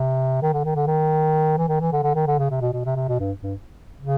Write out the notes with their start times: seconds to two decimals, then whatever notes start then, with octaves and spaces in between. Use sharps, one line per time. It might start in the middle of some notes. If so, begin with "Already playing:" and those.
Already playing: C3
0.42 D#3
0.53 D3
0.64 D#3
0.76 D3
0.87 D#3
1.57 E3
1.68 D#3
1.81 E3
1.92 D3
2.03 D3
2.15 D#3
2.27 D3
2.39 C#3
2.50 C3
2.61 B2
2.73 B2
2.85 C3
2.96 C3
3.08 B2
3.20 G2
3.42 G2
4.00 C#3